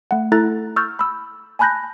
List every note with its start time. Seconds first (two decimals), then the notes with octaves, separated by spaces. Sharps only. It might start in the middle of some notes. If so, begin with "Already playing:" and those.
0.11 A3 F#5
0.32 A3 E4 A4 A#5 F#6 A6
0.76 C#6 E6 F6 G6 A6
0.99 B5 E6
1.59 G#5 A5 B5 F#6 G6 A#6